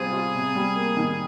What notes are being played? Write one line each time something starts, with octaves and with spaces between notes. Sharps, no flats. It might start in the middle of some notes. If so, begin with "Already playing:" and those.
Already playing: C3 G3 C4 F4 G#4
F4
C3
G3
A#3
D#3